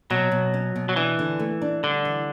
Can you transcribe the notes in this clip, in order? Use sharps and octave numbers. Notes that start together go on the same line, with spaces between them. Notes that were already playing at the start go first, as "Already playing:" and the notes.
B2 F#3
B2
C#4
B2
F#3
E3 D4
D3
A3
D4
D3 G3
E3